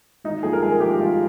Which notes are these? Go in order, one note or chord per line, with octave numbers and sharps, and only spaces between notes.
G#1 D#4
G2 F3 G#3 G#4
A#4
G#1 G#4
G2 F3 G#3 G4
G#1 F4